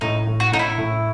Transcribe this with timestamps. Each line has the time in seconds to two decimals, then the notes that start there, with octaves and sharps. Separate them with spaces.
0.01 A2 D#4
0.27 A2
0.40 F#4
0.52 A2 D#4
0.59 E4
0.78 A2